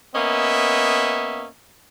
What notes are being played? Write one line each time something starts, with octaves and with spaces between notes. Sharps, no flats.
A#3 B3 C#4 D#5 E5